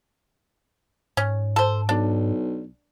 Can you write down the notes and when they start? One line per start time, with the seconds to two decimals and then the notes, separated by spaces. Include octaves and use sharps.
1.17 G#2 C#4
1.56 A4 C5
1.89 B1 D4